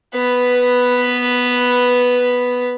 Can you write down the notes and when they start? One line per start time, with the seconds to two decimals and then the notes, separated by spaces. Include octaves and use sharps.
0.14 B3 B4